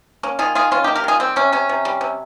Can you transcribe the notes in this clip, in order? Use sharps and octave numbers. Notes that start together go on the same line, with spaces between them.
A#3 C#4
D#3 F4 G#4
D#3 F4 G#4
D#3 C#4 F4
A#3 D#4 G4
G4 A#4
D#3 F4 G#4
G3 C4
C3 C#4
C3 C#4
C3
G3
C3